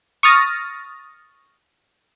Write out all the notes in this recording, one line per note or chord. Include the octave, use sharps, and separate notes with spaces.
C#6 D#6 F6 A6 A#6